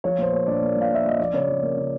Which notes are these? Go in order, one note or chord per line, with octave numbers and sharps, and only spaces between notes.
F3 C#5
A#2 C5
A#3 C#5
A#2 D4 D5
A#3
A#2 F5
A#2 E5
A#2 D#5
F3 D5
C#3 C#5
F3
A#3
C#3